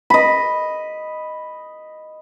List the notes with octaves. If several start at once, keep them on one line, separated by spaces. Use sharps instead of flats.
D#5 B5